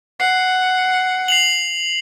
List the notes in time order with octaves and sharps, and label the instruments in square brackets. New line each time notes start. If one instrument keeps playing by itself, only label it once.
[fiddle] F#5 [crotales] C7
[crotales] C7 F7 F#7